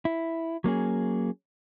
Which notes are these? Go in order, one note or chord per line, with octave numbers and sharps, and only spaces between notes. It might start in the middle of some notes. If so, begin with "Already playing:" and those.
E4
F#3 A#3 C#4 G#4